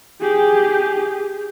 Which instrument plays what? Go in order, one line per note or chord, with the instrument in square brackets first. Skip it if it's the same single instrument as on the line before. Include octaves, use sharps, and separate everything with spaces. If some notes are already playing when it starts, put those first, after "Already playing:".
[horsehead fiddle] G4 G#4